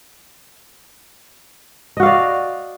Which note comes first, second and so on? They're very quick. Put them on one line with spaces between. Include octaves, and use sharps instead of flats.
D#5 F#4 F5 D5